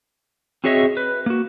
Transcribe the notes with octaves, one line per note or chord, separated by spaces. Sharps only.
C4 F#4 G#4 C#5 D#5 E5
B4
A#3 F#4